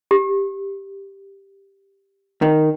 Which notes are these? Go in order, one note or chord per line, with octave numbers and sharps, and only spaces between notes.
G4
D#3